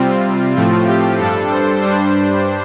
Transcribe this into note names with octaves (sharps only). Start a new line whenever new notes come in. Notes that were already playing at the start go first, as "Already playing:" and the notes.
Already playing: C3 G3 C4 F4
A2 F3 A3 C4
G4
G2 G3 D4 A4
C5
G2 G3 D4 C5